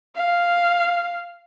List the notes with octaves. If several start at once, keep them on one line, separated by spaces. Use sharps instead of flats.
F5